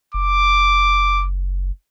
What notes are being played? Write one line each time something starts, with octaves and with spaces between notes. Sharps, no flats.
F#1 D6